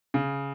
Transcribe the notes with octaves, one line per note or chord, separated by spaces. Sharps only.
C#3